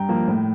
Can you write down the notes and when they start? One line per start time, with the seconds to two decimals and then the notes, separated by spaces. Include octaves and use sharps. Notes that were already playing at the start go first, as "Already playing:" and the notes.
Already playing: G2 G5 A#5
0.09 F3 A#3
0.28 A2